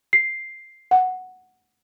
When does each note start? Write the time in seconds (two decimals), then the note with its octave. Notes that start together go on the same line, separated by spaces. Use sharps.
0.13 C7
0.91 F#5